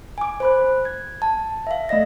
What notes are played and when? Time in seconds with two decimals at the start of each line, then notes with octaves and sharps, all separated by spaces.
0.18 G#5 D6
0.40 C5 B5 F#6
0.85 G#6
1.22 A5
1.67 E5 F5
1.89 A3 D5 D#5 A#6